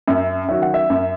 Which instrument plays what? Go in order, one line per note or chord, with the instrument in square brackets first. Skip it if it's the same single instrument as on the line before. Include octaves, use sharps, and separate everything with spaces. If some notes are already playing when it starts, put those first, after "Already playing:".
[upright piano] F#2 [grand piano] E5
[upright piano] D#3 F#3 C#4 F#4 [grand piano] E5
[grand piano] F#5
E5
[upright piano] F#2